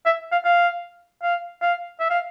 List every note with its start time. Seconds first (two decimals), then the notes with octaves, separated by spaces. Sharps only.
0.06 E5
0.32 F5
0.45 F5
1.23 F5
1.62 F5
2.00 E5
2.10 F5